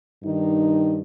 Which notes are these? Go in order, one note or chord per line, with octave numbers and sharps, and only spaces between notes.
G2 D#3 D#4